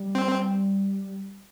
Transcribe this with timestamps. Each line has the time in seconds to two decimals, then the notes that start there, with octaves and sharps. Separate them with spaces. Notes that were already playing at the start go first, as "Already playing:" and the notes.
Already playing: G3
0.15 C4